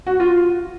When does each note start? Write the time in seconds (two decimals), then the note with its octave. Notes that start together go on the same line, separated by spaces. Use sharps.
0.07 F#4
0.20 F4